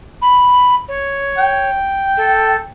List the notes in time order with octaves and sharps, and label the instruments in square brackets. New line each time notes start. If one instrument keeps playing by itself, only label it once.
[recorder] B5
C#5
[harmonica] G5
[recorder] A4